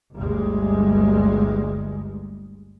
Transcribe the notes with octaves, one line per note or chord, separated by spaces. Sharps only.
G1 D2 G3 G#3